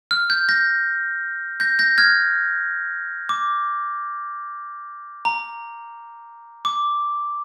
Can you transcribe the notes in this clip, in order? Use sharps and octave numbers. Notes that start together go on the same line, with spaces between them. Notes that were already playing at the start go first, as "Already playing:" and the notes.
F6
G6
G6 A#6
G6 A#6
G6 A#6
F6 G#6
D6
A#5
D6